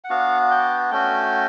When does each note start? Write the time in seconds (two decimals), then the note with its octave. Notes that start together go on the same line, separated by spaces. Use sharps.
0.04 F#5
0.10 B3 D4 F#4 F5
0.51 G5
0.91 A3 C#4 F#4 G5